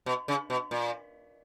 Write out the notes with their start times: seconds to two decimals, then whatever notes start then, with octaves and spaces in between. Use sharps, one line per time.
0.06 B2
0.28 C#3
0.50 B2
0.71 A#2